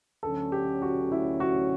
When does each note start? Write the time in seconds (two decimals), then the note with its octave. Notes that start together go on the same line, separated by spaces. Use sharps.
0.23 D2 D3 F#3 C#4 A4
0.52 G4
0.82 F#4
1.12 E4
1.40 F#4